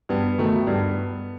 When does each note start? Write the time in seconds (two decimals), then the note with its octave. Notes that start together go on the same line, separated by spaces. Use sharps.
0.09 G2 B3
0.38 D#3 F#3 A3
0.67 G2